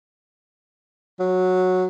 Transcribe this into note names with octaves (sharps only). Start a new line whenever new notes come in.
F#3